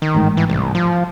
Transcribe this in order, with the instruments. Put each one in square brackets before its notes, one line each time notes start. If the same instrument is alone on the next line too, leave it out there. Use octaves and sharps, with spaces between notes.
[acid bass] D#3
[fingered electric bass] A1 G#2
[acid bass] E3
C2
F3